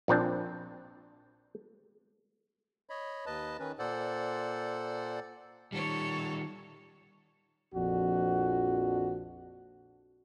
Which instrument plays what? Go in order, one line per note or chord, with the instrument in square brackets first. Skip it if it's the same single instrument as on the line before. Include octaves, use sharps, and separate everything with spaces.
[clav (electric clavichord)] A#1 A#2 C4 D4
[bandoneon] C#5 D#5 B5
D#2 B4 D#5 A5
D#3 C#4 B4
A#2 A4 C5 D5 F#5
[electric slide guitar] D#3 G3 [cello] A4 C#5
[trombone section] A#1 F2 D4 F#4